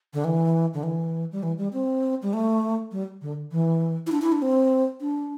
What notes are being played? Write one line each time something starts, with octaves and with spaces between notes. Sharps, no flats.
D3
E3
D3
E3
G3
E3
G3
C4
G3
A3
G3
D3
E3
E4
D4
E4
D4
C4
D4